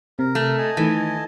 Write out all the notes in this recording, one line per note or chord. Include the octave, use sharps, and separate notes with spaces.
C3 A#4
A3
D#5 G#5 A5
D#3 E3 A3 D#4